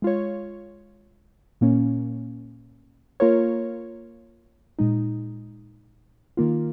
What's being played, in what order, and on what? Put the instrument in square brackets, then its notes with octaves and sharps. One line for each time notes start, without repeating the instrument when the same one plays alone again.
[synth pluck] G#3 F4 C#5
A#2 A#3 C#4
A#3 F4 A#4 C#5
A#2 G#3 D#4
D#3 A#3 F4